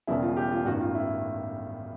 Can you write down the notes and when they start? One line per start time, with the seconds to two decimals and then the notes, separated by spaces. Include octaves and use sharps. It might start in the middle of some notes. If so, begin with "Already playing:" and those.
0.07 E1 E2 C#3 E3 G3 E4
0.22 F4
0.37 G4
0.52 F4
0.65 A1 G2 D#3 F#4
0.81 F4
0.95 E4